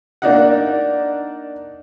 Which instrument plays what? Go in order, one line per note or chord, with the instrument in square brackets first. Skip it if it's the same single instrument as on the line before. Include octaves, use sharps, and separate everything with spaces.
[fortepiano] A#3 D4 D#4 F#5